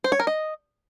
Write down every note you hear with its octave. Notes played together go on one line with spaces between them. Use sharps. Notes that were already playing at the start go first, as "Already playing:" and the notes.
C5
C#5
A#4
D#5